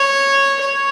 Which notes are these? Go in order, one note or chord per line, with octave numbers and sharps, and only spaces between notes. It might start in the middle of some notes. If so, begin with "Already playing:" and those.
Already playing: C#5
C#5